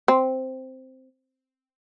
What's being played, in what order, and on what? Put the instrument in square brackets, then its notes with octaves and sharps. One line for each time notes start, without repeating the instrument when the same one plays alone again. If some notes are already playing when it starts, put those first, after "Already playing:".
[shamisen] C4